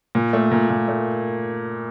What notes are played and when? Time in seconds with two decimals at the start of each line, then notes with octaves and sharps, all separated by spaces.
0.15 A#2
0.33 A3
0.52 A#2
0.70 A#2
0.88 A3